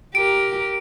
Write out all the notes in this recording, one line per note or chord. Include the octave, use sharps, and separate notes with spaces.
G4 A#4 D7